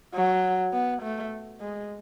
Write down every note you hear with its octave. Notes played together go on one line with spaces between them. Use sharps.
F#3
B3
A3
G#3